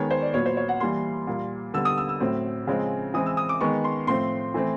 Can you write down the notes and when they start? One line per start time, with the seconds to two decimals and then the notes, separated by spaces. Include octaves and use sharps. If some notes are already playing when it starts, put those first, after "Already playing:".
Already playing: D#3 G#3 B3 C#5
0.11 C5
0.22 D5
0.34 A#2 F#3 B3 C#5
0.46 C5
0.57 C#5
0.69 F#5
0.80 E3 G3 A#3 C6
1.27 A#2 G3 A#3
1.74 D3 G3 B3 E6
1.85 D#6
1.98 E6
2.09 E6
2.20 A2 F#3 A3 C4
2.67 C#3 F3 G#3 C4
3.14 E3 G#3 C4 D#6
3.26 E6
3.37 D#6
3.49 D6
3.61 D#3 G#3 B3 C#6
3.84 C6
4.07 A2 F3 A3 C4 C6
4.54 E3 A3 C4